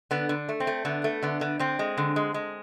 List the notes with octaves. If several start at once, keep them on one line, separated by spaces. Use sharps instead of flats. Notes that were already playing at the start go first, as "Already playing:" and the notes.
D3 B3
D3
A3
C4
A3
D3 B3
A3
D3 B3
D3
D3 C4
G#3
D3
G#3
G#3